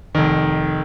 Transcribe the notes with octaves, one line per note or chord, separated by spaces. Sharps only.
F1 D#3